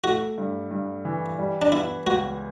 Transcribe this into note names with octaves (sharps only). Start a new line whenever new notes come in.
A3 F#4
G2
G2
E3
G3
D4
B3 E4
C#2 F#4